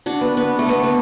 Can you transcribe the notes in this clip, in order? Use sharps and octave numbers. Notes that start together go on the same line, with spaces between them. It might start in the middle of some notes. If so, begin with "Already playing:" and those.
D4 F#4
B3
B3
A3
B3
B3